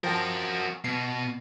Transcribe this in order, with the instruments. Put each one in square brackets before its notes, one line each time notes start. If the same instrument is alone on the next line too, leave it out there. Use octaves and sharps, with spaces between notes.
[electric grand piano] F3 G5 A5 [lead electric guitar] F#4 A#4
[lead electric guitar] B2 [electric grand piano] C7